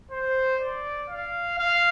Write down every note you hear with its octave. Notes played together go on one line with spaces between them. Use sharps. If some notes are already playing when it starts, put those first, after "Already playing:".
C5
D5
F5
F5